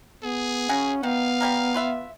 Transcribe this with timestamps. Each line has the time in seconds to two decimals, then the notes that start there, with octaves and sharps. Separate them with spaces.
0.23 B3 G#4
0.69 C#3 C#4 F#4 G#5
1.03 D#3 B3 F5
1.41 G3 G#3 A#4
1.74 F4 B4 E5